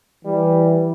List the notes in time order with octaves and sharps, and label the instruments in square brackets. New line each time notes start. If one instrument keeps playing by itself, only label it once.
[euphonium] E3 [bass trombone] G3